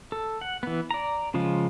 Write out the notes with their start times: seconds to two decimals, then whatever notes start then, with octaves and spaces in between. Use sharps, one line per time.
0.12 A4
0.41 F#5
0.63 E3 B3
0.91 D5 A#5
1.34 C#3 F3 G#3 F4